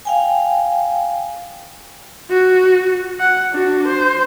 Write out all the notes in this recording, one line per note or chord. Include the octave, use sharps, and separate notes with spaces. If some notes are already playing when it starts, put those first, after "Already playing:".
F5 G5 G#5
F#4
F#5
D4 F#4
C5